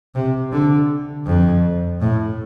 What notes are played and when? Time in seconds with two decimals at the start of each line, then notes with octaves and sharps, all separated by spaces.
0.15 C3
0.52 D3
1.26 F2
2.00 A2